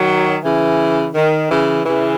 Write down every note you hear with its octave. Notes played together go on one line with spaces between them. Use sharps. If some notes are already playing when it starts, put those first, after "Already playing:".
Already playing: D#3 F#3
C#3 E3
D#3
C#3 E3
C#3 E3